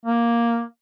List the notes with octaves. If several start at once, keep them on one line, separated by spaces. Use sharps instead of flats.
A#3